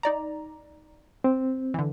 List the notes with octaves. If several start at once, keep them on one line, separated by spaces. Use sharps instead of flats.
D#4 D5 A#5
C4
D3 E3